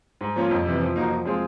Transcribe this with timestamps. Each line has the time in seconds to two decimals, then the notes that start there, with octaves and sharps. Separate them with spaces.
0.21 G#2
0.36 F3 A#3 C#4 F4
0.51 F2
0.66 C3 E3
0.81 F3
0.96 A#3 D#4 F#4
1.11 F3
1.25 G#3 C4 F4 G#4